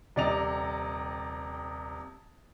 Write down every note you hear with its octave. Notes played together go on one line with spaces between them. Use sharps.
D#1 C3 D5 D#5 F7